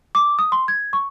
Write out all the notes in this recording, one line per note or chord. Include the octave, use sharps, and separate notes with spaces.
D6
D#6
C6
G#6
C#6